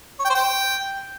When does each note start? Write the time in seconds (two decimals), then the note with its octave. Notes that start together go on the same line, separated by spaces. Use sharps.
0.20 C#5
0.25 G5
0.30 C5
0.35 G5